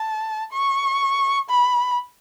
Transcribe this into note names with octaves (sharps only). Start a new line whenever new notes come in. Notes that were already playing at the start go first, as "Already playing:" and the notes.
Already playing: A5
C#6
B5